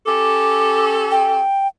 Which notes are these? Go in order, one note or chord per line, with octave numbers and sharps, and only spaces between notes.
C#4 G4 A4 D6
G5